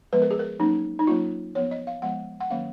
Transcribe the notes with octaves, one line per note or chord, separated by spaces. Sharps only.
F3 G#3 B3 B4
A#4
G#4
A#4
F#3 A#3 C#4 D#4
D#4
F#3 A#3 C#4 F4
F3 B3 C#5
D#5
F5
F3 G#3 B3 F#5
F#5
D#3 F#3 A#3 C#4 F5